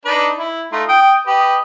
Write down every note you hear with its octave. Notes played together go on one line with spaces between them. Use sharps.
D4 D#4 B4
E4
A3 D#4 F4
G5 D#6
G4 B4 D#5